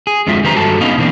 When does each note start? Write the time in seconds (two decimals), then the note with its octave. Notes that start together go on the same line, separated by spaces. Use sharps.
0.07 G#4
0.27 F2 D3 F#3 G#3 F4 E5
0.44 D#3 G4 B4 C5 A#5
0.56 G2 F#4 A4 A5
0.81 B3 C#4 D#4 D#5 F5
0.98 B2 E3 A#3 C4 D4